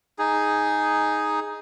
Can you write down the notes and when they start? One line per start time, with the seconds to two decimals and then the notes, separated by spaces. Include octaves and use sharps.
0.19 D#4 G#4